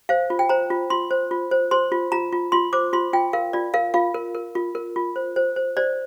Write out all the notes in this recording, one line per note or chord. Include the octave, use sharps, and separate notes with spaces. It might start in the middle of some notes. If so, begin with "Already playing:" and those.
C5 F5
F4
G5
C5 A#5
F4
F4 C6
C5
F4
C5
C5 C6
F4
F4 A#5
F4
F4 C6
C5 D6
F4 C6
F4 G5
A#4 F5
F4 D5
A#4 F5
F4 F5
A#4
A#4
F4
A#4
F4
C5
C5
C5
C5 D5